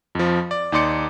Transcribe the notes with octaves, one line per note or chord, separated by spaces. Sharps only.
F2 F3
D5
D#2 D#4 D5 C6 D6 C#7